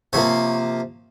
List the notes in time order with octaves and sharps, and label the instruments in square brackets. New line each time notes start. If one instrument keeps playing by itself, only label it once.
[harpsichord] C3 F3 A#3 C#5